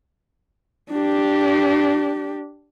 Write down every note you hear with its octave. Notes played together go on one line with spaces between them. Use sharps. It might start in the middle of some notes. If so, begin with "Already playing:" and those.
D4 G4